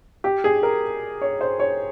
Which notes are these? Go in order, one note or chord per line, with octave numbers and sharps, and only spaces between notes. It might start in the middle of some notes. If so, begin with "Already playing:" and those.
G4
G#4
A#4
C#5
C5
C#5